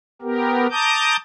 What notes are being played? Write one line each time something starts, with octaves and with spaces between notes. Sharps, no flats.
B3 G4 A#4
A5 A#5 D6 D#6 G6